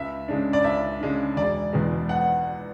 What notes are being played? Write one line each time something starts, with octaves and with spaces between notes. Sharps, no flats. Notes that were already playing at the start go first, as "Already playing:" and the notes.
Already playing: C#2 E5
C#3 G#3 D4
D5
C#2 E5
C#3 G#3 D4
E1 D5
E2 B2 G#3
F#5